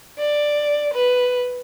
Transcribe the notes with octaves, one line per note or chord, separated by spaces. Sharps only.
D5
B4